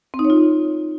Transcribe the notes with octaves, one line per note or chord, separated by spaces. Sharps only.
C4
D#4
C#5
F4